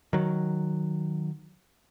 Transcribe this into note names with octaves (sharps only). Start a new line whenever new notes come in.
D#3 F#3